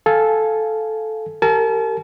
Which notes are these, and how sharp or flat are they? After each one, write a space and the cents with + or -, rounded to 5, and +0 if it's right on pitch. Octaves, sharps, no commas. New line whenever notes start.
A4 -10 F5 +0 G#5 +0
G4 +0 A#4 -35 A5 -40